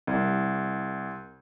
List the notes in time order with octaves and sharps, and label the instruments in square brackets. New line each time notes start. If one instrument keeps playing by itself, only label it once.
[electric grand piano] C2